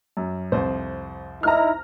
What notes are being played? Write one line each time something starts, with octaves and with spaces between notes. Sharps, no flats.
F#2
C2 F2 C5
D#4 E4 A#5 F6